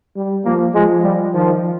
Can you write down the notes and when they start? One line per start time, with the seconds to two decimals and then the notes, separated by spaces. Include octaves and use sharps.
0.16 G3
0.45 F3 A#3
0.74 F3 G#3
1.03 G3
1.33 D#3 F3